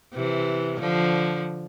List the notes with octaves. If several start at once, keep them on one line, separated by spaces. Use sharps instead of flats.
C3 E3
D3 F3